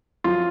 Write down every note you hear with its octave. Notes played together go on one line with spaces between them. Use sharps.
F#2 F3 F4